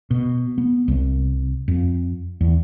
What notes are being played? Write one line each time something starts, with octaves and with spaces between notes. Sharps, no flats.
B2
B3
C2
F2
E2